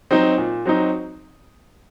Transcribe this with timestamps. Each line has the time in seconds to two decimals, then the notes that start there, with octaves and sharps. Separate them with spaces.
0.11 F#3 C4 D#4
0.38 A#2
0.66 F#3 C4 D#4